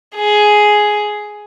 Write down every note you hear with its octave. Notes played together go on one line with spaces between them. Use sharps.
G#4